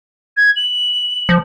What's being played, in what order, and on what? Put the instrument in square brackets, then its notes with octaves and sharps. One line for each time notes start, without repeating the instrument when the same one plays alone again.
[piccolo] G#6
F#7
[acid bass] F3